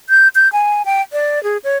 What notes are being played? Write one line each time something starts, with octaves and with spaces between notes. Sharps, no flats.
G6
G6
G#5
G5
D5
G#4
C#5